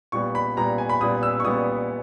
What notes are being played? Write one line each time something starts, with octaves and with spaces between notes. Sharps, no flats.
A#2 G3 B3 C#6
B5
A#2 G3 B3 A#5
G#5
B5
A#2 G3 B3 D#6
E6
C#6
A#2 G3 B3 D#6